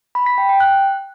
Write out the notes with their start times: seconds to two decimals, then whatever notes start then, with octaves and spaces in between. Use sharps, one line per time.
0.15 B5
0.26 B6
0.38 G5
0.49 G5
0.60 F#6